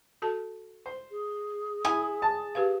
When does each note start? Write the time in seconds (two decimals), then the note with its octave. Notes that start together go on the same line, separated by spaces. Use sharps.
0.22 F#4 A4 A5
0.86 C5
1.11 G#4
1.85 E4 G#5 D#6
2.22 A5
2.55 G4 B4 F5